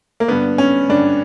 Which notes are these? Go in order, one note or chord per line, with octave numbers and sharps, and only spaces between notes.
A#3
G2 D3 B3
C#4
G2 D3 D4